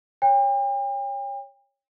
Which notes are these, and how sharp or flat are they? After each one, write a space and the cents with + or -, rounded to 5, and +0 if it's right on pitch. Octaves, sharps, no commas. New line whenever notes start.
C#5 +0 G5 +40